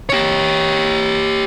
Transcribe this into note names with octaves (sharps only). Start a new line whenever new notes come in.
G4 C#5